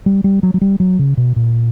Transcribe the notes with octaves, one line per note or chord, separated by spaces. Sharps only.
G3
G3
F#3
F#3
G3
F#3
C#3
B2
A#2